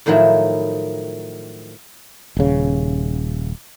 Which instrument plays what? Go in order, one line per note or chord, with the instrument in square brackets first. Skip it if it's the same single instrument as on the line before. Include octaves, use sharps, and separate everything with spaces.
[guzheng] A2 D#3 F3 F#3 E4
[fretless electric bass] D#1 C#3